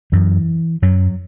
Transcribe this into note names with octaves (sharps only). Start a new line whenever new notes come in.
F#2 E3
F#2 F#3